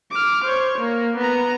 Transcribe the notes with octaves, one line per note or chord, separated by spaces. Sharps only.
D6 F6
C5 C#5
A#3
B3 A#5